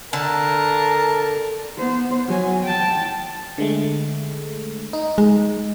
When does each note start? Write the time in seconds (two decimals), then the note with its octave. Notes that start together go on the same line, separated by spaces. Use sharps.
0.13 D3 A#4 A5
1.78 B3 C5
2.28 F#3 G#5
2.63 G5 A5
3.58 D3 G#3 A3
4.93 D#4
5.18 G#3